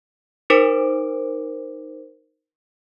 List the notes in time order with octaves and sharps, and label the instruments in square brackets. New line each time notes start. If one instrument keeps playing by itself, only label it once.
[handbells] D#4 A#4 C5 D6 D7